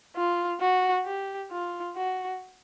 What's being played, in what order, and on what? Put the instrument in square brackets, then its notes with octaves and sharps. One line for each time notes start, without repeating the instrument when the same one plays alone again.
[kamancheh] F4
F#4
G4
F4
F#4